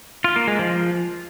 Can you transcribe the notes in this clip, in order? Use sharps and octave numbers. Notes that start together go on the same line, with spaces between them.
F4
A#3
G#3
F3